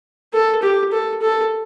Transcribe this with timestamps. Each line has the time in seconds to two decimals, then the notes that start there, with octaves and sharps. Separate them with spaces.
0.33 A4
0.63 G4
0.92 A4
1.22 A4